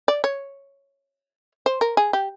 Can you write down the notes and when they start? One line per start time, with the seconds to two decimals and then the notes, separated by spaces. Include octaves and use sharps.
0.08 D5
0.24 C#5
1.66 C5
1.81 A#4
1.97 G#4
2.13 G4